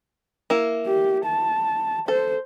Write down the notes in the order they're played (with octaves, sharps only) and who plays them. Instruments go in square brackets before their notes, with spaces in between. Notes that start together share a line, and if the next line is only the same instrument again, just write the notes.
[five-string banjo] A#3 E4
[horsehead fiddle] G4
A5
[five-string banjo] A4 [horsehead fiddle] C5